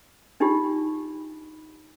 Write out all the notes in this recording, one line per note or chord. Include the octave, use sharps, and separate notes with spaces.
D4 D#4 F4 G4